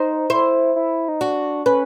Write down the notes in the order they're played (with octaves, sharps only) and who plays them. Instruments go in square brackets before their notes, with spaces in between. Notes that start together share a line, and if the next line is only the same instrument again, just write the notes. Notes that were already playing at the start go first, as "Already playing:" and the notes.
Already playing: [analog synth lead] D#4 [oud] C5
[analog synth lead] E4 [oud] C5
[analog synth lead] E4
D#4
[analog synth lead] D4 [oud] F#4
[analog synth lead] C#4 [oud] B4